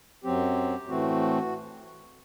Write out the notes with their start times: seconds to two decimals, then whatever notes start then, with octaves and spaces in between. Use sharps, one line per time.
0.24 F#2 F#3 C4 G4
0.87 A2 E3 A3 C4 F#4